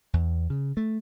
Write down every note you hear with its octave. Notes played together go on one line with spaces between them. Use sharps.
E2
C#3
A3